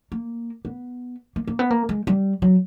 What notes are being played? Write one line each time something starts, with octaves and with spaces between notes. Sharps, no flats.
A#3
B3
A#3
A#3
B3
A#3
G#3
G3
F#3